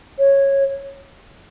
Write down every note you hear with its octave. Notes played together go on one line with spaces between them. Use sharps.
C#5